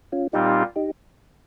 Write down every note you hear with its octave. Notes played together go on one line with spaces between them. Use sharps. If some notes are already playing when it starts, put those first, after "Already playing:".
C#4 F4
A#2 G3 C4 D#4 F4 G4
D#4 G4